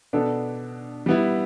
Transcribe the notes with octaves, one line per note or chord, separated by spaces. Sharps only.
B2 B3 D4 A4
G3 B3 E4